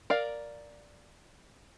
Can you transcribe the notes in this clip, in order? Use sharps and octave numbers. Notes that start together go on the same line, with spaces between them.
A#4 D5 F5